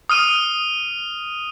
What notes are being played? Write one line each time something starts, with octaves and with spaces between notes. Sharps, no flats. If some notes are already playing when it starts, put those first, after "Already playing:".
D#6 F6 D#7